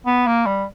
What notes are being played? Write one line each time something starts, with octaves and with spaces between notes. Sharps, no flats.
B3
A#3
G3